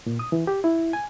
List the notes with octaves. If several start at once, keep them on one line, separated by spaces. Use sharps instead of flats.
A#2
D#6
E3
G4
E4
G#5